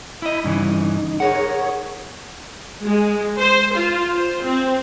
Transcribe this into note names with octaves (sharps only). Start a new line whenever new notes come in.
E4 D#5 B5
G2 C#3 E3 D#4
G#4 A#4 C#5 F#5
G#3
C5
F4
C5
C4